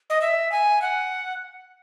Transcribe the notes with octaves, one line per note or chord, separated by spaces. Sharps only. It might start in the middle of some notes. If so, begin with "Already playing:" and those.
D#5
E5
G#5
F#5